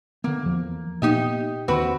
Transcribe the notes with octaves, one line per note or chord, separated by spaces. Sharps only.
D3 A#3 B3
E2 F3
A#2 A#3 B3 D#4 G4 D#5
D#2 D3 C4 F#4 B4